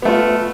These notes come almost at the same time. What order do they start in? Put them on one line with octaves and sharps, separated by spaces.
B3 A3 F4